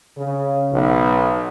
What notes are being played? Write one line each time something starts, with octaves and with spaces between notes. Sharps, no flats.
C#3
B1